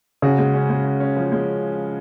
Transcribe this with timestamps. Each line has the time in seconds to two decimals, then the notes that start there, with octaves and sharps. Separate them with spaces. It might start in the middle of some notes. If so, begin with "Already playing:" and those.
0.22 C#3 F#4
0.38 G#3
0.54 C#4
0.69 G#3
0.84 F#4
1.00 C#4
1.17 F3
1.32 G#3